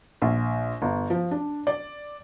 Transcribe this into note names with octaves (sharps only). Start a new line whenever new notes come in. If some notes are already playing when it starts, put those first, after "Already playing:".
A#1
G1
F3
D4
D5